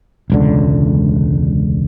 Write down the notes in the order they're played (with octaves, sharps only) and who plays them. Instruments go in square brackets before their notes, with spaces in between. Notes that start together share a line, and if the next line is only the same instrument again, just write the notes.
[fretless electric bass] E1 C#2 D3